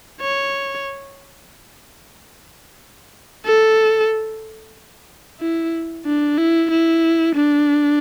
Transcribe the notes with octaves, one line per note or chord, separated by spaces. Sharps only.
C#5
A4
E4
D4
E4
E4
D4